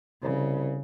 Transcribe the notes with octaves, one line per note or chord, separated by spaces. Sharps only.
C2 C#3